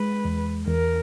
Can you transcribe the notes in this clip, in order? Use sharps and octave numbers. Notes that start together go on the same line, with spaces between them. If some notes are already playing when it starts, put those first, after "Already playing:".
Already playing: G#3 B4
E2
E2 A#4